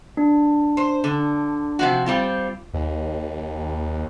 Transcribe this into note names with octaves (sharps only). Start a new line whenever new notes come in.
D4
C5
D3
C3 F3 F#4
G3 C4 F4
D#2